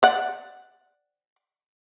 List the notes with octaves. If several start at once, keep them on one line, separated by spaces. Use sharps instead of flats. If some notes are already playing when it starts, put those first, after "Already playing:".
D5 F#5